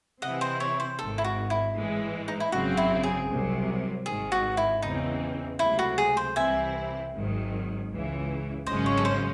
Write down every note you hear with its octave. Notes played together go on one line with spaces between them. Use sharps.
C3 E3 C4 E4 D#5 F#5
C5 D#5
C#5
C5
G#1 G#2 D#3 A4
E4
F#4
E4
A2 E3 G#3
D#4
E4
G#1 F#2 C#3 F#3 C4 F#4
E4
G#4
C2 C3 F#3
G#1 G#2 D#3 G#4
F#4
E4
E2 C#3 E3 C4 D#4
C#2 C3 F#3 A3 E4
F#4
G#4
C5
C2 C3 E3 C4 E4 E5 G#5
G#1 G#2 D#3 F#3
C#2 C#3 E3
G#1 F#2 C#3 G#3 C#4 C5 D#5
C#5
A4
C5